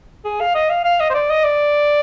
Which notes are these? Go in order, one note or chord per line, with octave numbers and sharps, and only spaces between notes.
G#4
F5
D#5
F5
F5
D#5
C5
D5
D#5
D5